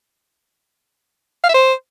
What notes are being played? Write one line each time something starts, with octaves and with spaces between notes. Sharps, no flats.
F5
E5
C5